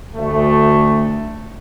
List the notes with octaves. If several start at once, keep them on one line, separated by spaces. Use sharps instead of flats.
D2 A3